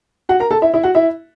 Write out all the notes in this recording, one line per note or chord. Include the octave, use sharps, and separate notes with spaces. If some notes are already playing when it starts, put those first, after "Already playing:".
F#4 F#5
A#4 A#5
A4 A5
E4 E5
E4 E5
F#4 F#5
E4 E5